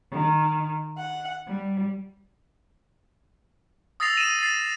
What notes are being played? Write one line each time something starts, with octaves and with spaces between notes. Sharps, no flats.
D#3
F#5
G3
D#6 E6 A6 A#6 C7 F7
D#7 E7
A6 C7